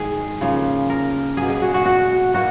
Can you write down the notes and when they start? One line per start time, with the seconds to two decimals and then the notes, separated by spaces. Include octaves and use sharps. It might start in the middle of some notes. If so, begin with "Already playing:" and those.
Already playing: G#2 D#3 G#4
0.41 C#3 F3 A#3
0.90 A#4
1.37 B2 A#3 G#4
1.50 G#4
1.62 F#4
1.74 F#4
1.86 F#4
2.34 B2 A#3 F#4